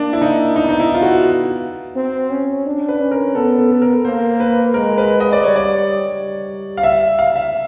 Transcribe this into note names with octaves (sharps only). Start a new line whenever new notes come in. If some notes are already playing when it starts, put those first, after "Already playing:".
Already playing: A#3 D4
E4
D#4
B3 D#4
D#4
E4
F4
F#4
C4
C#4
D4
B4
C#4
A#4
B3 A4
A4
A4
A#4
A#3 C5
B4
G#3 A#4
B4
D#5
D5
G3 C#5
D5
G3
F5
E5
F5
E5